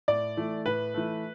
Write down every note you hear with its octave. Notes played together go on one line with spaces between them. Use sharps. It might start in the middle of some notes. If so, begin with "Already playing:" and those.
A2 D5
E3 A3
A2 B4
E3 A3